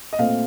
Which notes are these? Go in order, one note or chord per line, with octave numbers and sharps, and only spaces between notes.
D#5
A#2 A3 C4 F5